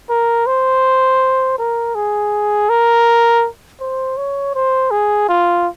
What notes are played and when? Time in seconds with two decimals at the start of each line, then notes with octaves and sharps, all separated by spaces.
0.09 A#4
0.47 C5
1.58 A#4
1.95 G#4
2.70 A#4
3.80 C5
4.17 C#5
4.55 C5
4.91 G#4
5.29 F4